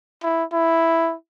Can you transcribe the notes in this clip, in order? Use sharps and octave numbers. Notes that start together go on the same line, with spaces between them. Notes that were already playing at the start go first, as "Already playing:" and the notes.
E4
E4